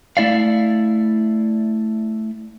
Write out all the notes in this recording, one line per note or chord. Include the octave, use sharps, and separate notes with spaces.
A3 E4 D5 F5